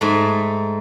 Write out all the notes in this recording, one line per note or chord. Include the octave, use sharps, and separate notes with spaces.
G#2 A3